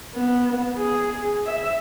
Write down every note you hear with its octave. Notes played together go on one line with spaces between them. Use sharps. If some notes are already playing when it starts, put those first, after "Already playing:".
B3
G#4
E5